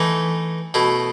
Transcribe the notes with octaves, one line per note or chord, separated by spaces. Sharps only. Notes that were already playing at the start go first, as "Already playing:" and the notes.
Already playing: E3 A3 D#4
B2 A3 E4